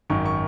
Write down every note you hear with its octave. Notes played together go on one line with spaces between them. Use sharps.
G#1 F#2 D#3 C#6
C#6